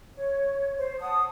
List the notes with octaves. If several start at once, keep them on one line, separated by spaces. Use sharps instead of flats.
C#5
C5
F#5 A5 D#6